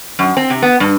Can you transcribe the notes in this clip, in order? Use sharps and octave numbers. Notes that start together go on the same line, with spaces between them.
F#2
C4
C3
B3
G2